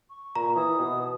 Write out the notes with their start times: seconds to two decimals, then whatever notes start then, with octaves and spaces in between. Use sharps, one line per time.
0.10 C#6
0.35 A#2 A#5
0.55 E3 D#6
0.79 B2